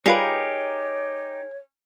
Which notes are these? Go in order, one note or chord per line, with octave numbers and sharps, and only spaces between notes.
G3 D#4 F4 G4 G#4 A#4 B4 C#5